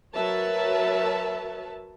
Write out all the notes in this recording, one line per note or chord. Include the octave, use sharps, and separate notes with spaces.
F#3 A#4 B4 C#5 E5 A5